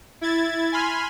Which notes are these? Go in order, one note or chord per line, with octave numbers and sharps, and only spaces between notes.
E4 G#6 A6
G#5 B5 C6 F6